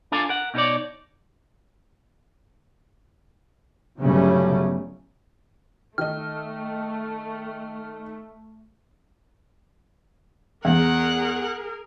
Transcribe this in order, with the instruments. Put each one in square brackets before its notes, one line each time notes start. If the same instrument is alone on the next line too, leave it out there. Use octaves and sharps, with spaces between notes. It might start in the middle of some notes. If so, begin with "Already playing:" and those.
[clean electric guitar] D4 F4 A4 A#4 F5 G#5
A#4 F#5
B2 D#4 G4 A#4 C#5 D5
[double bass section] G1 C#3 F#3 G3 A3 C#4
[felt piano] D#3 D#5 [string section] A3 [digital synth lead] F6
[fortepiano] E2 [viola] G#4 A#4 [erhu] F#5